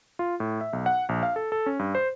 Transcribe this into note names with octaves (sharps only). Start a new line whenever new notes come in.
F4
A2
E5
B1
F#5
A#1
F5
A4
A4
C#4
G2
C5